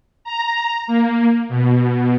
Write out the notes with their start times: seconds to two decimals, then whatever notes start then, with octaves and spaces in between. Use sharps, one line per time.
0.24 A#5
0.87 A#3
1.49 B2